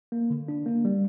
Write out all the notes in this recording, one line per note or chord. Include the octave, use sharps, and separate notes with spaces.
A#3
D3
D4
A#3
G3